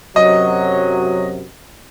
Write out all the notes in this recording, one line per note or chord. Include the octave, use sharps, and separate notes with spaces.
F#2 C3 F#3 D#5